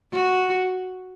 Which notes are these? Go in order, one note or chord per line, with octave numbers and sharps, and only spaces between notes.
F#4